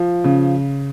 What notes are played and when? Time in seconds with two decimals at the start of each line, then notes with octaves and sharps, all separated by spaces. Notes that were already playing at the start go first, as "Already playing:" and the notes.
Already playing: F3
0.24 C#3